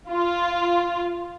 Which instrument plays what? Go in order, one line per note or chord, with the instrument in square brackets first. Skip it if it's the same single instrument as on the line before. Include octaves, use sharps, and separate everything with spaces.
[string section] F4